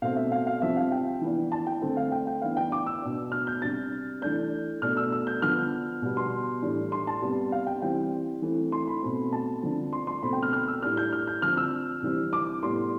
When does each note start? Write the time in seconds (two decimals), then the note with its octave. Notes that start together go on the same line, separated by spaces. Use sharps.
0.02 B2 A3 C4 F5
0.16 E5
0.32 F5
0.47 F5
0.62 C3 F3 C4 E5
0.77 F5
0.92 G5
1.21 E3 B3 D4
1.52 A5
1.67 G5
1.82 D3 A3 C4
1.97 F5
2.12 G5
2.27 G5
2.42 E3 B3 D4 F5
2.57 G5
2.72 D6
2.86 E6
3.02 B2 B3 D4
3.32 F6
3.47 G6
3.62 C3 G3 D4 A6
4.22 E3 A3 D4 G6
4.82 B2 A3 D4 F6
4.97 E6
5.12 E6
5.27 G6
5.42 D3 F3 B3 F6
6.02 B2 G3 B3
6.17 C6
6.62 A2 E3 G3 D4
6.92 C6
7.07 A5
7.22 C3 G3 B3
7.52 F5
7.67 G5
7.82 E3 G3 C4 G5
8.42 E3 A3 C4
8.72 C6
8.87 B5
9.03 B2 A3 C4
9.33 A5
9.63 D3 F3 C4
9.93 C6
10.07 C6
10.22 B2 A3 C4 B5
10.33 G5
10.43 F6
10.53 F6
10.68 E6
10.82 A2 G3 D4 F6
10.97 G6
11.12 F6
11.27 G6
11.42 D3 F3 C4 F6
11.57 E6
12.02 C3 E3 G3 C4
12.33 D6
12.63 A2 G3 B3 C6